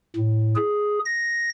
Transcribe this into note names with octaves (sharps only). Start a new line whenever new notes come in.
A2
G#4
A#6